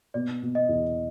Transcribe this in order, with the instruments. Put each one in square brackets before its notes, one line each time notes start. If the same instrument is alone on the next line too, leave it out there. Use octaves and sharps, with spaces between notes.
[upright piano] B2 [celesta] D5
[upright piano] B2
[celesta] D#5
[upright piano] E2